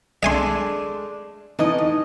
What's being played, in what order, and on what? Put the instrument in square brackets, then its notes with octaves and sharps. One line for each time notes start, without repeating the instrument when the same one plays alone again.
[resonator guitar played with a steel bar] G#3 A3 D4 [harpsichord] E5 G#5 C6
[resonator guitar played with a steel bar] A2 D#5 [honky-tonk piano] E3 D#4